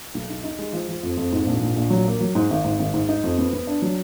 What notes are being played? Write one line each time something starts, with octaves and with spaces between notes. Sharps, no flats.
B1
D#4
D#4
G#3
F3
F3
F2
F2
G#2
A#1
A#1
A#1
F#3
A#3
F#3
G#2
G#1
G#2
G#1
G#2
D#4
F2
B3
B3
D4
F#3